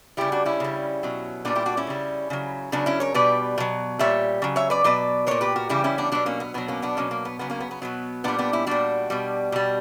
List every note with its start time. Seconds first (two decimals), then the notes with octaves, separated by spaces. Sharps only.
0.17 C#3 G3 E4 G4
0.32 D4 F#4
0.45 C#4 E4
0.60 C#3 G3
1.03 B2 F#3
1.45 A#2 G3 B3 D4
1.55 E4 G4
1.66 D4 F#4
1.77 C#4 E4
1.87 C#3 G3
2.30 C#3 F#3
2.72 C#3 F#3 B3 D4
2.86 C#4 E4
3.00 A#4 C#5
3.14 B2 G3 B4 D5
3.58 B2 F#3
3.99 A#2 G3 C#5 E5
4.42 C#3 F#3
4.56 C#5 E5
4.70 B4 D5
4.84 B2 F#3 B4 D5
5.27 A#2 F#3 A#4 C#5
5.41 G4 B4
5.56 F#4 A#4
5.69 C#3 E3 G3 E4 G4
5.84 C#4 E4
5.98 B3 D4
6.12 B2 F#3 B3 D4
6.26 A#3 C#4
6.40 B3
6.54 B2 F#3 B3
6.68 A#3 C#4
6.82 B3 D4
6.97 B2 F#3 A#3 C#4
7.11 A#3
7.25 B3
7.39 C#3 F#3 B3
7.50 A#3 C#4
7.60 B3
7.71 B3
7.82 B2 F#3 B3
8.24 A#2 G3 B3 D4
8.38 B3 D4
8.53 C#4 E4
8.67 A#2 G3 D4 F#4
9.10 B2 G3
9.52 B2 G3